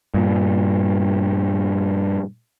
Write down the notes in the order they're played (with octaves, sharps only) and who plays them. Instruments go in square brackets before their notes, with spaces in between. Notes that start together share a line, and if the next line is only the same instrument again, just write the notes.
[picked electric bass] G2 A#2